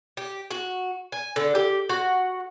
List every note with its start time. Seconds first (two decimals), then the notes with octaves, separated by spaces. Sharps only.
0.17 G4
0.51 F#4
1.12 G#5
1.36 D3
1.55 G4
1.89 F#4